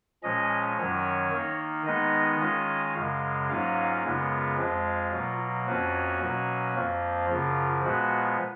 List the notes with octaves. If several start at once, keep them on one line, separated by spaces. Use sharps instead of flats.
A#2 F3 G#3 C#4 D#5
F#2 D#3 F#3 C#4 C#5
D#3 A#3 D#4
D#3 G#3 B3 D#4 D#5
D#3 G#3 C#4 F4 D#5
F#2 C#3 G#3 F5
G#2 F#3 A#3 C#4 F4 F5
F#2 C#3 G#3 B3 F4
F2 F3 G#3 F4
B2 F#3 A#3
F2 F3 A#3 C#4 F4 F#4
B2 F#3 A#3 C#4
F2 F3 A#3 F4
F#2 C#3 F3 F4
A#2 F3 G#3 B3 F#4